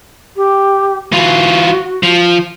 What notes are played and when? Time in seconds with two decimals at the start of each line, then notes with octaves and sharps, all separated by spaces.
0.36 G4
1.12 E3 F4 F#4
2.03 F3